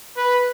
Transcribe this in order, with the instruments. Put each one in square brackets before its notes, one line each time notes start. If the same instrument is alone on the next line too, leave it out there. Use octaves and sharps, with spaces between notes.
[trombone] B4